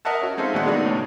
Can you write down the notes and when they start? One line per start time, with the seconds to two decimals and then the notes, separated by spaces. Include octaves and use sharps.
0.05 A#4 D#5 E5 F#5 A5
0.21 C#4 F#4
0.37 G#3 C4 D#4 A4 E5 F5
0.54 A#1 B2 D#3 G#3 F#5
0.66 F#3 G#3 A3 B3 D4 D#4
0.84 C#2 A2 C#4